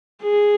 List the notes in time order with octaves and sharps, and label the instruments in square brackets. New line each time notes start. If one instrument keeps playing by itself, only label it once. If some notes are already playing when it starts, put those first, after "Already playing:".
[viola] G#4